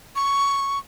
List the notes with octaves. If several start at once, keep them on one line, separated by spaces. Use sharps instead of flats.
C#6